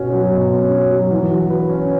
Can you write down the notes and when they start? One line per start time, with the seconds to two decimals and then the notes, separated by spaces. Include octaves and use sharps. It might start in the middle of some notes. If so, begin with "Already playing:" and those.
Already playing: B2 C#4 F#4
0.13 F#3
0.32 B2
0.52 C#4
0.72 F#4
0.91 F#3
1.11 E3
1.30 F#4
1.50 B4
1.69 C#4